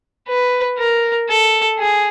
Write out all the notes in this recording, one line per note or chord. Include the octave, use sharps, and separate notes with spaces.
B4
A#4
A4
G#4